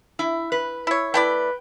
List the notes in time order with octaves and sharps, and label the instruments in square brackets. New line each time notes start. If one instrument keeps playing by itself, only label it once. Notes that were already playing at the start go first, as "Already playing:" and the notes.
[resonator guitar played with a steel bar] E4
B4
[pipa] E4 C#5
[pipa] A3 E4 D5 [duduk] B4 [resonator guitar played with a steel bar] G5